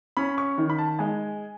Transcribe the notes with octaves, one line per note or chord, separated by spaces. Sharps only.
C#4 B5
C#6
D#3
B5
A5
G#3 G#5